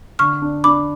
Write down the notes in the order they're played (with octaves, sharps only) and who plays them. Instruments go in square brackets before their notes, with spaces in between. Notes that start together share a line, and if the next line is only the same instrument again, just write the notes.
[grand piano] D3 [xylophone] C#6 F6
[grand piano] D4
[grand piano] D4 [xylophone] B5 D6